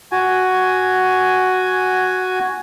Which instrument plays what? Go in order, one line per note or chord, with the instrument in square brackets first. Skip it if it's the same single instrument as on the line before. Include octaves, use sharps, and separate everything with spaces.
[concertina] F#4 G#5